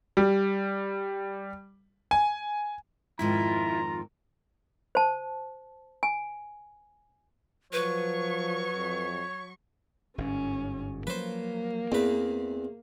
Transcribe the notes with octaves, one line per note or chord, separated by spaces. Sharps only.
G3
G#5
F2 G#2 D#3 E4 F4 A#5 C6
C5 A5
G#5
F3 F#3 B4 C#5 C#6
F2
G1 G#2 C#4
F3 F#3 A#3 B4 C5
E2 C4 B4